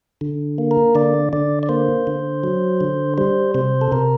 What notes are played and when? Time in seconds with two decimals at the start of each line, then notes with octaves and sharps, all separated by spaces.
0.21 D3
0.58 A#3
0.71 A#4
0.95 D3 D5
1.33 D3 D5
1.63 D5
1.69 A#3 C5
2.07 D3
2.44 F#3
2.81 D3
3.18 G3 C5
3.55 C3 C5
3.81 A4
3.92 C3 A#4